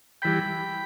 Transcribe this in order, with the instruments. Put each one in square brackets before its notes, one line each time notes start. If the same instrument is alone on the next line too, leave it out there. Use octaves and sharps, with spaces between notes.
[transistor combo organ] E3 G3 G5 B5